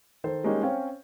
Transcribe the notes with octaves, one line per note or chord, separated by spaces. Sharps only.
D#3 A4 C5
G3 G#3 A#3 C#4 D#4 G4
C4 C#4 C5 C#5 F5 G5